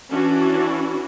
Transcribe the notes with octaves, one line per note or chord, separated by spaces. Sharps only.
E3 C#4 D4 F#4